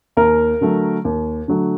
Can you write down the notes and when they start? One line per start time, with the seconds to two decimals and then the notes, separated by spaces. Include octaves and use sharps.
0.17 D#2 A#4
0.61 D3 F#3 A3
1.05 D#2
1.48 D3 F#3 A3